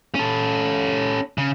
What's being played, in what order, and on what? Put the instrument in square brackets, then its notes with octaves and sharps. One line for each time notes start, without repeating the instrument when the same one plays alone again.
[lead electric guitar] C#4 A4
C#3